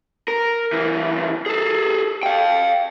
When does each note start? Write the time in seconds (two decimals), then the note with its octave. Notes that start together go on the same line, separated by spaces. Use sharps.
0.28 A#4
0.73 C#2 E3
1.46 G#4 A4
2.23 F5 G5